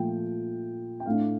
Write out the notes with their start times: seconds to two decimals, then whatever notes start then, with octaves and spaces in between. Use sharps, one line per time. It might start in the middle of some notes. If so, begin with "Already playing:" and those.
Already playing: A#2 F3 A3 G5
1.00 G5
1.06 A2 A3 D4 F5